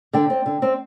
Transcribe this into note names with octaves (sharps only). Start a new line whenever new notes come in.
D3 D5 G5
C4
D3
C4